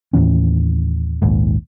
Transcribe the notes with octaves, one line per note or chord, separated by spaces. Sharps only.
D#2 A2 E3 C#4
A#1 D#2 G#2